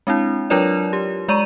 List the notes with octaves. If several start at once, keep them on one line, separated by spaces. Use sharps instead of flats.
G#3 C4 D4 E4
F#3 D4 F4 A#4 C#5 D5
G4
G#3 D5 A#5 C#6 D#7